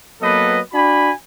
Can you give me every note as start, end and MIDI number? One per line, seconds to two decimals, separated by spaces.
0.22 0.60 54
0.22 0.60 58
0.22 0.60 59
0.22 0.60 69
0.22 0.60 71
0.22 0.60 75
0.73 1.11 62
0.73 1.11 66
0.73 1.11 80
0.73 1.11 83